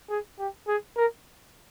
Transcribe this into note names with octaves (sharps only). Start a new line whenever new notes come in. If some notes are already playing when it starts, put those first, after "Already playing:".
G#4
G4
G#4
A#4